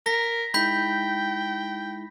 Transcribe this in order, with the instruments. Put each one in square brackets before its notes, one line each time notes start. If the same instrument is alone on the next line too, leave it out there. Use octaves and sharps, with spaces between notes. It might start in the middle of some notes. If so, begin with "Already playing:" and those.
[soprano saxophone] A#4 [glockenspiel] A#6 B6
[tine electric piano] G#3 D#4 E4 [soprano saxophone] G5 [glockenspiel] B5 G6 B6